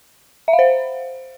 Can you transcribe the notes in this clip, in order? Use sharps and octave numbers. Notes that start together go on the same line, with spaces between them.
E5
F5
C5